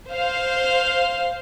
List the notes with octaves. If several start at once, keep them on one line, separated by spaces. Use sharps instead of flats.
C5 F5